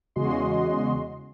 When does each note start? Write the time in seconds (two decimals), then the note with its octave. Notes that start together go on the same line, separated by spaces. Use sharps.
0.16 E2 C#3 G#3 F#4 D#5 C6